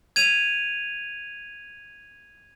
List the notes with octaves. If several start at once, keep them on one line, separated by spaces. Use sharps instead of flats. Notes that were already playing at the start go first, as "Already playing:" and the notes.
G#6 D#7 F7